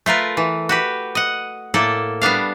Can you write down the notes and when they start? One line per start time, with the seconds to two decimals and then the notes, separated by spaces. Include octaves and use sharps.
0.06 A3 F4 A#4 B4
0.37 E3
0.69 F#4 G4 B4
1.15 D#5 F#5
1.74 A2 A#3 A4 D5 A5
2.22 G3 B3 D4 F5